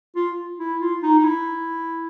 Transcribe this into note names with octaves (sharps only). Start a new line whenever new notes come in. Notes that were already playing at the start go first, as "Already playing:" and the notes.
F4
E4
F4
D#4
D#4
E4